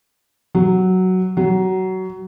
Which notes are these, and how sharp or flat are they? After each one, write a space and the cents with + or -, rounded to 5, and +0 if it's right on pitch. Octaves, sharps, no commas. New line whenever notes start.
F#3 +5
F#3 +20